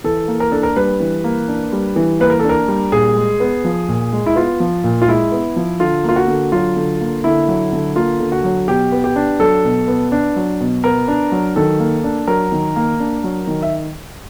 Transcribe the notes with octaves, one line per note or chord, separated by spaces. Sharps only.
E3 A4
A#3
A#4
D4 A4
A#4
G3 B4
E3
A#3
D4
G3
E3
A#3 B4
A#4
A4
D4
A#4
G3
A#2 G#4
G#3
B3
F3
A#2
G#3
E4
B3 F4
F3
A#2
F4
G#3 E4
B3
F3
D3 F4
A#3 F4
F#4
D3
F#3 F4
D3
A#3
D3 E4
F#3
D3
A#3 F4
D3
F#4
F#3
B2 G4
B3
G4
D4
F#3 A4
B2
B3
D4
F#3
B2
B3 A#4
D4
F#3
D#3 A4
A#3
D4
F#3 A#4
D#3
A#3
D4
F#3
D#3
E5